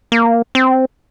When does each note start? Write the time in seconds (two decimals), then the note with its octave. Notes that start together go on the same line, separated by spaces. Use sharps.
0.12 A#3
0.55 C4